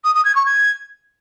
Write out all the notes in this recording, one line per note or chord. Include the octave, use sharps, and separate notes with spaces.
D#6
D#6
G#6
C#6
G#6